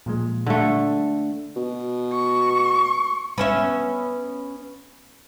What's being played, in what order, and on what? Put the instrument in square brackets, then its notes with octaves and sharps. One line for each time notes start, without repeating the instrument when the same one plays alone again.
[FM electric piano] A#2 F3 G#3
[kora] D3 A3
[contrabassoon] B2
[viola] C#6
[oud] B3 C#4 E5